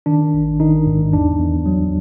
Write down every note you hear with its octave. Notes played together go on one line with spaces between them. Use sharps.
D#3 D4
A1
D#3 D#4
G#2
E2 D4
E2
F#3